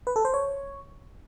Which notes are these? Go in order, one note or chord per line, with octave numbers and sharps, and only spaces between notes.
B4
A4
C5
C#5